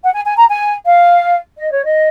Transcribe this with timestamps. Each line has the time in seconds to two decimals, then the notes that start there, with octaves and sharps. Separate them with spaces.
0.03 F#5
0.13 G#5
0.25 G#5
0.37 A#5
0.49 G#5
0.85 F5
1.57 D#5
1.72 C#5
1.84 D#5